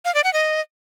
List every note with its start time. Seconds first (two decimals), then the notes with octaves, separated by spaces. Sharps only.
0.05 F5
0.14 D5
0.24 F#5
0.33 D#5